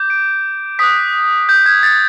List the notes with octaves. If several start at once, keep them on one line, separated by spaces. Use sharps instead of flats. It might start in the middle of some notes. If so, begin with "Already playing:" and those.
Already playing: D6 G6
D7
D#6 F#6 B6
G6
G#6
A6